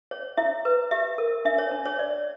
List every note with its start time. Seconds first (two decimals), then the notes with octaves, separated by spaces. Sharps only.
0.11 C#5
0.37 E4 E5
0.65 B4
0.91 G4 E5
1.18 A#4
1.45 D4 E5
1.58 C#5
1.71 D4
1.85 C#5
1.98 C#5 D5